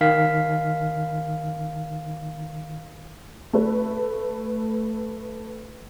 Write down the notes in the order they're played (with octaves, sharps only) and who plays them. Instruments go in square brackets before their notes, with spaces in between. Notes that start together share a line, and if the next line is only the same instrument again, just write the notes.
[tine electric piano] D#3 F5 B6
[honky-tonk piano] A3 B4